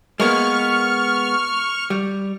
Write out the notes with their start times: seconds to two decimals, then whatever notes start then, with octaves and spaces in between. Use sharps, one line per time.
0.20 G#3 A#3 B3 C#6 F6
1.90 G3